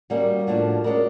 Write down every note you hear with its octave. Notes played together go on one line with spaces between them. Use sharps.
D#3 G3 A#3 C#4 F#4
A2 F3 A#3 D4 F#4
G#3 C#4 F#4 A#4 D5